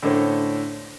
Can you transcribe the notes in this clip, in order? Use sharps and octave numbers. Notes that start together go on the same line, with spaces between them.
A2 D3 C#4 A4 C5